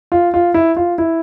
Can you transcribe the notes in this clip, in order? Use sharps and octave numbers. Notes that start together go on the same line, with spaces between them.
F4
F4
E4
F4
E4